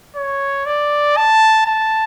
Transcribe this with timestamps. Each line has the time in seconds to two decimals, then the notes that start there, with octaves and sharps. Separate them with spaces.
0.16 C#5
0.66 D5
1.17 A5
1.66 A5